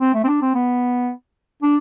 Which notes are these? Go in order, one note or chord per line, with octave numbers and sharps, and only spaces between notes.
C4
A3
C4
D4
C4
B3
D4